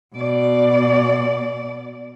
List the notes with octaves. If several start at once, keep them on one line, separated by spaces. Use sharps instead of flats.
B2 D5